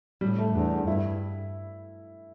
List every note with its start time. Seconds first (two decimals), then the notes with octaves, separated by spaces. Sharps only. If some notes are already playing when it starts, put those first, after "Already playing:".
0.21 A2 G3
0.38 A3
0.55 E2 D4
0.87 G2 E4